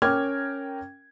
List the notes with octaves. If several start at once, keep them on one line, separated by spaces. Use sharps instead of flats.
C#4 A#4 G5 D6 F6 G#6